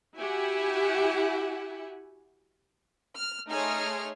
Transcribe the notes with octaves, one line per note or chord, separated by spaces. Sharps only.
E4 F#4 G4 E5 F#5 G#5
F6
A3 D#4 G#4 C#5 C6 F6